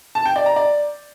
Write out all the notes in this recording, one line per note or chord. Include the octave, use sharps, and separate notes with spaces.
A5
G5
D5
A#5
D5